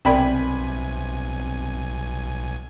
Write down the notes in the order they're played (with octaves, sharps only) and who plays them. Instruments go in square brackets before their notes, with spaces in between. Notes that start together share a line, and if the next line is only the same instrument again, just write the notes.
[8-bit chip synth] B1 G#5 [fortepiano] C3 B5 [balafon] A#4 D5 G5